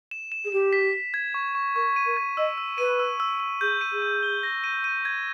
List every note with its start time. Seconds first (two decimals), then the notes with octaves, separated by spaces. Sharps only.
0.11 E7
0.32 E7
0.45 G#4
0.52 G4 E7
0.73 B6
0.93 B6
1.14 G#6
1.34 C#6
1.55 C#6
1.75 A#4 C#6
1.96 D#7
2.06 A#4
2.17 G#6
2.37 D#5 E6
2.58 E6
2.78 B4 D#7
2.99 E6
3.20 E6
3.40 E6
3.61 G#4 G6
3.81 D#7
3.92 G#4
4.02 D#7
4.23 G7
4.43 A#6
4.64 D#7
4.84 D#7
5.05 G#6